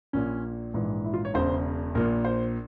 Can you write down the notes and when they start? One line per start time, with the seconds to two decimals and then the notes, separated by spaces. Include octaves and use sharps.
0.13 A#1 A#2 C#4
0.74 A#1 G#2 E3
1.04 E4
1.14 F4
1.25 C#5
1.34 E1 E2 C#3 C5
1.95 A#1 A#2 A#4
2.25 C5